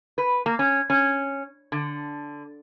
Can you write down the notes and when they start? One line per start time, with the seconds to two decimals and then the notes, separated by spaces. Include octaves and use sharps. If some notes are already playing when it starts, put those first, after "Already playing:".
0.18 B4
0.46 A#3
0.59 C#4
0.90 C#4
1.72 D3